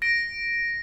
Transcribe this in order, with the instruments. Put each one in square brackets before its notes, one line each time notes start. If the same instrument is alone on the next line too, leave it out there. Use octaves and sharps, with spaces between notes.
[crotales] A#6 D7